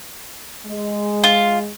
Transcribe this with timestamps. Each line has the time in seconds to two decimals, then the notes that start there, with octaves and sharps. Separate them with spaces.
0.67 G#3
1.24 F4